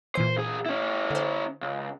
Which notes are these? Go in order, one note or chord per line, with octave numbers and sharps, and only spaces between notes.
A#2 E3 C5 G#5
B1 G#4
C#4 E4
D3 C5
C#2